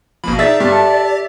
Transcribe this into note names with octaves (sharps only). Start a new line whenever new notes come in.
A1 B2 F3 A#3 B5
D#4 G#4 D5 E5 A6 B6
G2 G4
A4